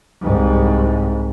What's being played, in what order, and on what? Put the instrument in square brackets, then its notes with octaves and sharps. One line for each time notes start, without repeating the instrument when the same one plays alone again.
[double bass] C2 G#2